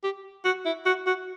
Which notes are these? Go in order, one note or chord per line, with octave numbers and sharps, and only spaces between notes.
G4
F#4
E4
F#4
F#4